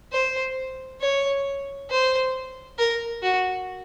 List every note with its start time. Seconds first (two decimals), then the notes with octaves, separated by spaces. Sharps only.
0.12 C5
1.01 C#5
1.90 C5
2.78 A#4
3.23 F#4